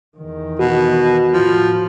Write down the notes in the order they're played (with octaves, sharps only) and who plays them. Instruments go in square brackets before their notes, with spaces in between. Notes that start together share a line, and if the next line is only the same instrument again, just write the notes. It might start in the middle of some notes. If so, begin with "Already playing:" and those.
[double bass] E2 D#3
[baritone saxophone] B2 [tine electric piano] F#4
[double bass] A2 [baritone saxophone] F3